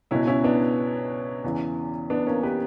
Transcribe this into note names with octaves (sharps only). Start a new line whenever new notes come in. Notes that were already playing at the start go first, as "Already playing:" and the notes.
C#2 B2 C#4 E4
C#4 E4
B3 D4
E2 C#3 E3
B3 D4
A#3 C#4
G4 B4